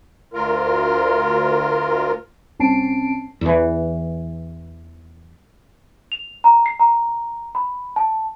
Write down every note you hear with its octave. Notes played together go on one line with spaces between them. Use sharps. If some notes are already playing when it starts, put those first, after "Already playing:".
D2 F4 A#4
C2 C4 C#4 A5 C7 D7
E2 E3
F7
A#5
C7
A#5
B5
A5